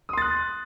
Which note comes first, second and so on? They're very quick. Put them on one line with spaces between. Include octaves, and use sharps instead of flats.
D#6 C6 A6 F#6